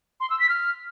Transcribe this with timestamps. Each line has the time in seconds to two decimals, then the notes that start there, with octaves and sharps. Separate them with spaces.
0.20 C6
0.30 E6
0.40 B6
0.49 F6